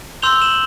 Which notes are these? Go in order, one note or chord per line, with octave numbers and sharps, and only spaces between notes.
C6 E6 G6 F7 G7
E7 F#7